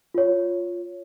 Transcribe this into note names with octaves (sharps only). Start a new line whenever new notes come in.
F4 C#5